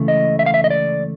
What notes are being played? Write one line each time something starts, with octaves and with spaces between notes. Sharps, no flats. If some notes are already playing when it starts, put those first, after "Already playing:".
Already playing: C#2 C#3 E3 A3
D#5
E5
F5
E5
D#5
D5